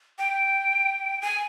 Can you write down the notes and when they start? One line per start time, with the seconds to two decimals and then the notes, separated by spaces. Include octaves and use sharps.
0.19 G5
1.21 G#5